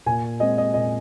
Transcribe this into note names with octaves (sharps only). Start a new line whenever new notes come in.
A#2 G#5
G#3 C4 D#5
D#5
A#2 D#5